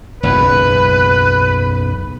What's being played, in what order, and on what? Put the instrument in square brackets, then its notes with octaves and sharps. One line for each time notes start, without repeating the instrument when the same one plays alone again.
[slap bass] F#1 B1 E2 [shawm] B4